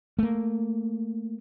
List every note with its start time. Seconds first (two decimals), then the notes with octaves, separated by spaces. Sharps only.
0.19 A3 A#3